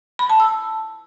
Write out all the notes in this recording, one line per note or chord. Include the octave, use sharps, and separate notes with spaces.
B5
A5
E6